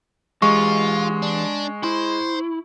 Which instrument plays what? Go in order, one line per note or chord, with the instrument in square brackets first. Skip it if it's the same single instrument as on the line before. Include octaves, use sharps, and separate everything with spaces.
[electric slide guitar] E3 G4 [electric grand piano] G#3 [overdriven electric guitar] F4 [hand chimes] C#6
[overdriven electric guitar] D4
[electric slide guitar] E4 [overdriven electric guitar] C5